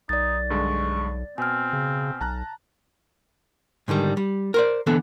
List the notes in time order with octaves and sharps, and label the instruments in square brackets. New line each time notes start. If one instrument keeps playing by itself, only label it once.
[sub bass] B1 [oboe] D#4 [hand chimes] D5 A6
[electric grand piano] G2 D3 G#3 [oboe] C#6
[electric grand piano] B2 [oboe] C4 [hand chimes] G#5 F6
[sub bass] C#3
[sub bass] B1 [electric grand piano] A5 A#5 F#6
[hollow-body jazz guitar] G#2 D3 D#3 G3
G3
A#4 C5 D5
D3 E3 B3 A4